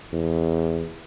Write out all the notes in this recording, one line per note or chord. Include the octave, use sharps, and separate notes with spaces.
E2